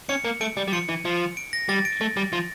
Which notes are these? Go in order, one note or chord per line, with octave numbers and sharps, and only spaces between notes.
C#4 C#7
A#3
A3 D7
G3
G3
F3 C#7
E3
F3
D7
A#6
G3 A6
D7
A3
G3
F3